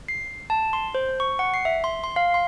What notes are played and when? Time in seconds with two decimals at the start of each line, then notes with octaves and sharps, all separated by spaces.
0.08 C7
0.50 A5
0.73 C6
0.95 C5
1.20 C#6
1.39 F#5
1.54 C7
1.65 E5
1.84 C6
2.04 C6
2.16 F5
2.34 C6